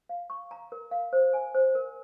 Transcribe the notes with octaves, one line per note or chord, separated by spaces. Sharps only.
F5
C#6
A#5
A#4
F5
C5
G#5
C5
A#4